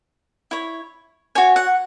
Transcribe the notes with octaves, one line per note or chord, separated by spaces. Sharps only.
E4 C#5
F#4 C#5 G#5
F#5